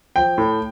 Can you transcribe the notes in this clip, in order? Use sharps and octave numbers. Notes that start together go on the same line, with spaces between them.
F3 G5
A2